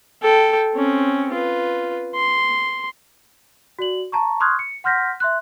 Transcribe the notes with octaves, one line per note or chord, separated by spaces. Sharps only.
A4 G5
C4 C#4
F4 B4
C6
F#4 D5 F#7
A5 A#5 C#6
C6 C#6 D#6 F6 F#6 G#6
C#7
F#5 C6 F6 G6 A#6 B6
E5 C6 F#6